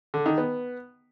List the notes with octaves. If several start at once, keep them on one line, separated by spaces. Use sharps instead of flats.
D3
D#3
B3